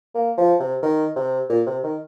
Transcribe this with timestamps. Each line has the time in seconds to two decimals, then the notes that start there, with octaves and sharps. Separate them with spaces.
0.15 A#3
0.38 F3
0.60 C3
0.82 D#3
1.16 C3
1.50 A#2
1.67 C3
1.84 D#3